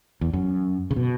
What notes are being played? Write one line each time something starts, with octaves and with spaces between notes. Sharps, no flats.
E2
F#2
C#3
B2